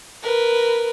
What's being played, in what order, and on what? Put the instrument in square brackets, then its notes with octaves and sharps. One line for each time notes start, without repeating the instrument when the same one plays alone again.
[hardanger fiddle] A#4 B4